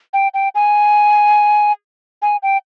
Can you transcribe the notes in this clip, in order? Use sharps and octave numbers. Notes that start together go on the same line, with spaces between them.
G5
G5
G#5
G#5
G5